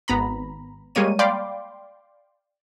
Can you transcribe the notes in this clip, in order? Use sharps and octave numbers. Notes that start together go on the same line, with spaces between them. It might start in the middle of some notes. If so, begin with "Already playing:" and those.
G#1 B3 A#5 B5
G3 G#3 A#3 C#5 D#7
D5 F5 G5 B5 C6 D6